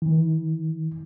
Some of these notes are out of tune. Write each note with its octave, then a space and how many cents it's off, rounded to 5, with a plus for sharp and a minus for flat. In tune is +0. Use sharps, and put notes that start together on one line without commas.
E3 -35